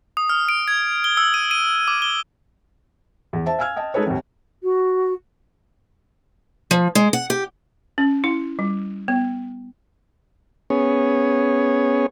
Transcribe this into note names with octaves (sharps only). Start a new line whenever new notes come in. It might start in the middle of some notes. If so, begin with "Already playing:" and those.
D#6
F6
D7
G#6
G7
E6
D#7
D#7
D6
G7
E2
C5 E5 A5
F5 G#5 E6 F6 G#6
D#5 G5 A5
G#3 D#4 G#4 A4 B4 C#5
G#1 D#2
F#4
F3
G#3
F#5
G4
C#4
E4
G3
B3
B3 C#4 G#4 C#5